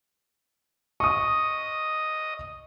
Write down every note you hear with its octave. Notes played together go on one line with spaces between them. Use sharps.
D#5 C#6 D#6